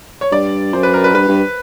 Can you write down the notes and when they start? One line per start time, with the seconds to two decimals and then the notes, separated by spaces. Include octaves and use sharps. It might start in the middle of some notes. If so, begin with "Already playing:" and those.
0.21 C#5
0.32 G2 D5
0.73 F#2 C5
0.83 B4
0.94 A#4
1.04 B4
1.15 G2 B4
1.28 G2